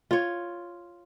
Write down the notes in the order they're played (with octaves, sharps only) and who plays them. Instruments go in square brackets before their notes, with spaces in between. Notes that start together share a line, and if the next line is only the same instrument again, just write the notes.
[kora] F4 C#5